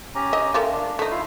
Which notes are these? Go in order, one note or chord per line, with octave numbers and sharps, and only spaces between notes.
C#4 G4 A#5
D#5
A3 A#3 F4
D4
A3 D#4
E4 F4 F5